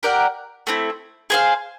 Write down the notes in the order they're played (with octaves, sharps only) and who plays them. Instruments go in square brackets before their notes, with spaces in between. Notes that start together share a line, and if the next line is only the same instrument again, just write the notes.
[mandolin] G4 A#4 D5 F#5
A3 C4 E4
G#4 C5 F5